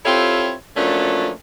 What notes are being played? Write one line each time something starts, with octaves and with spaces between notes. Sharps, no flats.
C4 E4 F4 G4 A4 C#5
F3 F#3 A3 A#3 C#4 D4